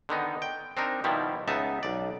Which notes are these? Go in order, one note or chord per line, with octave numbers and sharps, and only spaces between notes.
D3 D#3 B3 D#4
G5
C4 D4 D#4 A#4
B2 D#3 F3 G3 E4
C#2 B3 D#4 E5 A5
B1 D5